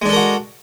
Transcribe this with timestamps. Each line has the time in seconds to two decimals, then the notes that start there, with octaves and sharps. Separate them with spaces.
0.02 G#3
0.05 D4
0.09 A4
0.13 A#4
0.16 F#4